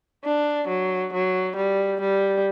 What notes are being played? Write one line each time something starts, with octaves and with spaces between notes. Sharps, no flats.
D4
F#3
F#3
G3
G3